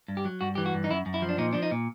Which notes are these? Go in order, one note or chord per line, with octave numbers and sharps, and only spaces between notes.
G2
G4
F#3
G2 F#4
E3 G4
F#4
G2
D#4
F#2 E4
F#2
E4
F3
D4
A#2 D#4
F3 D4
D#4
A#2